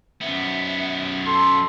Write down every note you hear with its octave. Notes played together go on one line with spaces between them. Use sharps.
F#2 B3 E5
A4 C6